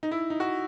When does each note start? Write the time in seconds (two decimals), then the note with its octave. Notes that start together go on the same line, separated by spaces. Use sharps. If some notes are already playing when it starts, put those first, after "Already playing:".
0.03 D#4
0.11 E4
0.30 D#4
0.40 F#4